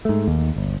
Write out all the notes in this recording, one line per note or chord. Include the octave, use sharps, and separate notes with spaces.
G#2 A3
D#2
G1